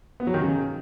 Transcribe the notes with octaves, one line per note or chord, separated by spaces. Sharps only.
B3
F#3
D#3
C#3